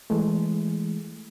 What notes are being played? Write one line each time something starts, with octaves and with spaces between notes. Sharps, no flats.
E3 G#3 A3